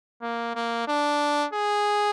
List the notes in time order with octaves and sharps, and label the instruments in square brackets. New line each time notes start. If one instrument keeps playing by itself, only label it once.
[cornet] A#3
A#3
D4
G#4